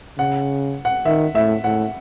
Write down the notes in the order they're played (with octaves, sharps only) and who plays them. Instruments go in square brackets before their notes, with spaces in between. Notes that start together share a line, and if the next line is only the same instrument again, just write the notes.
[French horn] C#3 [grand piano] F#5
[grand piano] F#5
[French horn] D#3 [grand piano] E5
[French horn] A2 [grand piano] E5
[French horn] A2 [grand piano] F#5